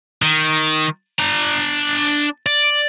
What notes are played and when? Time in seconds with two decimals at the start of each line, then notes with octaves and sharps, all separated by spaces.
0.22 D#3
1.19 D4 A#5
2.46 D5